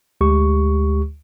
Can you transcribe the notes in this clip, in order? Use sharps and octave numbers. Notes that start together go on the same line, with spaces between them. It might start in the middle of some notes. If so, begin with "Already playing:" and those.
D2 G#3 G4 C#6